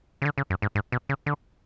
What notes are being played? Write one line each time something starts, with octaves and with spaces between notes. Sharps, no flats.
C#3
D3
C#3
F#2
G#2
G#2
B2
C#3
D3